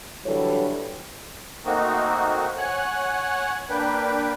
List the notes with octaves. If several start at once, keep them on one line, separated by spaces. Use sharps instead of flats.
D3 E3 F#3 G3 A4 C#5
A3 A#3 C4 D#4 F#4
C#5 F#5 G#5 F#6
A#3 D4 B4 G5